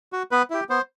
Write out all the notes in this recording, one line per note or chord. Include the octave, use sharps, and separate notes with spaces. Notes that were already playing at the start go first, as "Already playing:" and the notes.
F#4
B3 B4
E4 G4
B3 C5